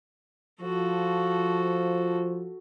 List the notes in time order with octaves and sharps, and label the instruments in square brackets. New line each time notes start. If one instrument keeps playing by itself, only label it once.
[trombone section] F3 [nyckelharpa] F#4 A4